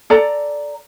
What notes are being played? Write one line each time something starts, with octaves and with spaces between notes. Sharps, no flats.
A4 D5 A#5